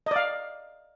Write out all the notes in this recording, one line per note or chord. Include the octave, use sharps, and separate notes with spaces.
D5 D#5 F5